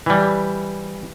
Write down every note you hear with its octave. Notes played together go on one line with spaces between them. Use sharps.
E3 G3